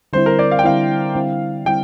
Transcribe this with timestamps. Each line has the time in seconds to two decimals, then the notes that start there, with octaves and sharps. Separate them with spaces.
0.13 D3 G3 C4 E4 C5
0.26 A#4
0.39 D5
0.51 F5
0.59 G5
0.64 D3 G3 C4 E4 F5
1.15 D3 G3 C4 E4
1.66 D3 G3 C4 E4 G5